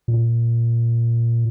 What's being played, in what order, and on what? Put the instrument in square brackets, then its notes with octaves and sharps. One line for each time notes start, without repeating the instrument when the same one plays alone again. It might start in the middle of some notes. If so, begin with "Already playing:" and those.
[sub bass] A#2